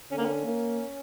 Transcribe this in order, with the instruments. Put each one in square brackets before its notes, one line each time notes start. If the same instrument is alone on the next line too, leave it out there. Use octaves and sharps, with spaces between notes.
[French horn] D3 [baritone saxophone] C#4
[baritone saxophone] A#3
C#4
[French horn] A#3